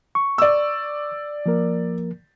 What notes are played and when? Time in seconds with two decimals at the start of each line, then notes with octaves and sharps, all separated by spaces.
0.15 C#6
0.38 D5 E6
1.46 F3 A#3 A#4